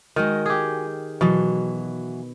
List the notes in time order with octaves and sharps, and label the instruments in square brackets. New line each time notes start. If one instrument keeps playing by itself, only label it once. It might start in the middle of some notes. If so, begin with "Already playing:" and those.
[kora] D#3 [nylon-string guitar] G#3 F#4 D#5
[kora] G4 G#4
[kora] B2 [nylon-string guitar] E3 F#3